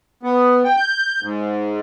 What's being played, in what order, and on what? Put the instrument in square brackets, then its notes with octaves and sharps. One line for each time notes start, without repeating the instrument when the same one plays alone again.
[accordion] B3
G5
G6
G#2